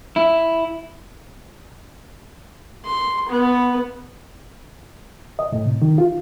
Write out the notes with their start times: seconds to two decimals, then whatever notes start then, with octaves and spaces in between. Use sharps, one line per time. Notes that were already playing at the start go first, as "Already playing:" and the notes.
0.16 E4
2.85 C6
3.29 B3
5.39 D#5
5.52 A2
5.66 C3
5.82 D#3
5.98 F4